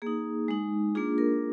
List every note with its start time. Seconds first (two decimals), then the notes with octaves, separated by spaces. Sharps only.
0.02 A#3 D#4 G#4
0.48 G#3 D#4
0.95 A#3 D4 F4 G#4
1.18 A#4